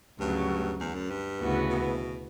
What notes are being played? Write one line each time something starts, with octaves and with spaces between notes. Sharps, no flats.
D2 G2 C#3 F#3
E2
F#2
G2
D2 C#3 E3 B3 F#4
B2